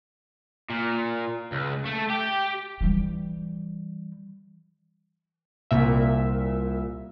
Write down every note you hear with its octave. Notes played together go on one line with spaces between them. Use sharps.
A#2
C#2
A3
G4
E3 G3
C2 A#2 E5